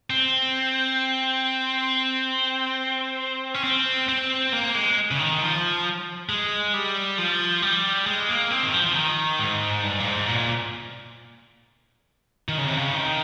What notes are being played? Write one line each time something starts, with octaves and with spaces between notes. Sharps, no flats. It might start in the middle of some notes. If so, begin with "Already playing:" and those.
C4
C#4
C4
C4
A#3
G#3
C#3
D#3
F3
G#3
G3
F3
G3
G#3
A#3
C4
D#3
F3
F3
D#3
G#2
G2
A#2
G#2
A#2
D#3
C#3
C3
C#3
D#3